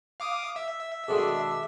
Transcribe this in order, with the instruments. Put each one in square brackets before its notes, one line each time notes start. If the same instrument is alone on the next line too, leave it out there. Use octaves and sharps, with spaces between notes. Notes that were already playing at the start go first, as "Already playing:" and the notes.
[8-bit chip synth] F5 D6 D#6
E5
[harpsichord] B2 D#3 G#3 [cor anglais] D4 [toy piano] G#4 A4